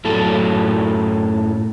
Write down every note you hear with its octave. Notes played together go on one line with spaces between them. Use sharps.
F#2 A2 F#3 A4